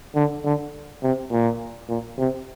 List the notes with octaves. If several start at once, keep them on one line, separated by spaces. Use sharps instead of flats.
D3
D3
C3
A#2
A#2
C3